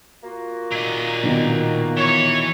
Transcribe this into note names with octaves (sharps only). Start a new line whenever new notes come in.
A#3 F4 F#4
A#2 D#5
B2 D#3
E3 C#5